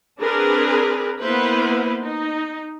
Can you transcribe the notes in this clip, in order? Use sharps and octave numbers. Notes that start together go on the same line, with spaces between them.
C4 D4 G#4 A#4 B4
A#3 B3 E4 B4 C5
D#4